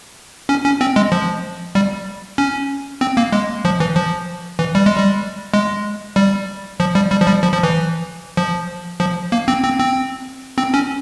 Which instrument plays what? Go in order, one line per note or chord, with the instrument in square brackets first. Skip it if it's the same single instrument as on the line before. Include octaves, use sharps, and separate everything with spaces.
[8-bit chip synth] C#4
C#4
C4
G#3
F3
G3
C#4
C4
A#3
G#3
F3
E3
F3
E3
G3
G#3
G3
G#3
G3
F3
G3
G3
F3
G3
F3
F3
E3
F3
F3
A#3
C4
C4
C4
C4
C#4